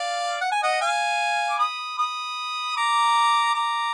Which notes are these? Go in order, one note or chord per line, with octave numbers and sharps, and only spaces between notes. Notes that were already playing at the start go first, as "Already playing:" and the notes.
Already playing: D5 F5
F#5
G#5
D#5 F#5
F5 G#5
D6
B5 D#6
B5 D#6
A#5 D6
A#5 D6